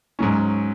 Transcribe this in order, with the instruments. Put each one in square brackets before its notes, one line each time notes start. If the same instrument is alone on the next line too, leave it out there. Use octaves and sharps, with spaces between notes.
[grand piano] G#2 F#3 C#4